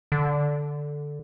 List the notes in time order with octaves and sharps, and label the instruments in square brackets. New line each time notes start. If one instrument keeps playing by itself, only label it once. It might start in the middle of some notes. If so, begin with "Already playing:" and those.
[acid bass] D3